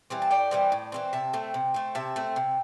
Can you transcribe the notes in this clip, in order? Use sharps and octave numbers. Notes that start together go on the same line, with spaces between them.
E3 G3 C4
A5
A2 D5 G5
E3 G3 C4
A2
E3 G3 C4
C3 E5 A5
A3 C4
C3
A3 C4
C3 E5 A5
A3 C4
C3